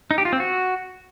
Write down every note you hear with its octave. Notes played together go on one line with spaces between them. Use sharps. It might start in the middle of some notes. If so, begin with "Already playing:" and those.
D#4
G4
F4
C4
F#4